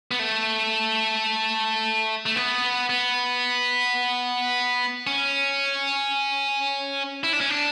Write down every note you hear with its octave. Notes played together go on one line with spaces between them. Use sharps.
B3
A3
A3
B3
B3
C#4
E4
D4
C#4
D4